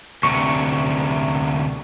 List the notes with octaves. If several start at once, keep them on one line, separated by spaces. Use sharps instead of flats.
D2 C3 C#6